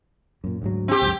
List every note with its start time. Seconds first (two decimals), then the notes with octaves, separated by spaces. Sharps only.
0.44 F#2 A#2
0.62 D2 G#2 F#3
0.88 C4 G4
1.02 C#2 F#2